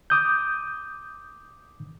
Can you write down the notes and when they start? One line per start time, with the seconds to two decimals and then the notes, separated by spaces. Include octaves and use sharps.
0.10 D6 D#6 G6